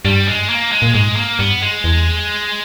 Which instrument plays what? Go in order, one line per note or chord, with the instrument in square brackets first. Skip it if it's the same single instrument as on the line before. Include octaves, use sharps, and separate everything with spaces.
[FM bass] G2 [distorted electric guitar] G3
[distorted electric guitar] G#3
A#3
G#3
[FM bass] A#2
[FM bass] G#2 [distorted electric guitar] G#3
[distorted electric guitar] A#3
[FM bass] G2 [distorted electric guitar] B3
[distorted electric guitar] G#3
[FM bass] E2